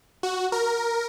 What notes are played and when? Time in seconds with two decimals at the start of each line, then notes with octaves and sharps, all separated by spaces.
0.23 F#4
0.52 A#4